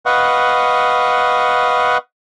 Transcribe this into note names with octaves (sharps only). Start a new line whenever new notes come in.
B4 D#5 F5 F#5 C#6